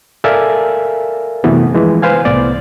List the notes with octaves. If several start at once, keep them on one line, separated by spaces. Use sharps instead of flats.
A4 A#4 D5 E5 F5 G#5
F#2 C3 E3 F#3 A3 B3
E3 F3 G#3
B4 C5 F5 G#5
C2 A2 B3 D5